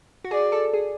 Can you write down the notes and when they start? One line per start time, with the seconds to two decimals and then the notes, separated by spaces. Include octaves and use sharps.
0.24 F#4
0.31 G#4 D5
0.52 A4
0.74 G#4